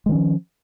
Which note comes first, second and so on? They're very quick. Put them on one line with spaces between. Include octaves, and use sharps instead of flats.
G#3 D#3 C#4 F3